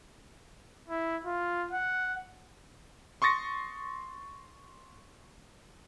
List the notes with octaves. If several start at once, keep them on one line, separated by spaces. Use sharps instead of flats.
E4
F4
F#5
C6 C#6 D#6 A6 A#6 C#7